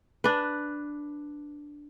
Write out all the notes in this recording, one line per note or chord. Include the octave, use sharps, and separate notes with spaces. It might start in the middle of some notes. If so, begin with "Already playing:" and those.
D4 B4